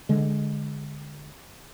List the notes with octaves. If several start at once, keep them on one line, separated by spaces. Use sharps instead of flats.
D3 G#3